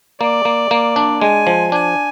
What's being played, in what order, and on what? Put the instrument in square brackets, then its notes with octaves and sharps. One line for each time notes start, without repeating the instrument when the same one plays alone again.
[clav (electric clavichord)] A#3 [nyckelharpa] D5
[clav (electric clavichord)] A#3
A#3
D4
[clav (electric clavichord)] G#3 [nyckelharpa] G#5
[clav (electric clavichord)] F3
[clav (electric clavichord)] D4 [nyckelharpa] G#5